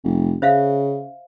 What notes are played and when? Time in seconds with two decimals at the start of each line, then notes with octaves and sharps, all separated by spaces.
0.03 F1
0.42 C#3 C5 E5 F5